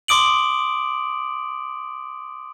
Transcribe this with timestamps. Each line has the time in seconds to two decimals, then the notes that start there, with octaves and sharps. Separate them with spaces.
0.08 C6 D6 D#6 D7 F#7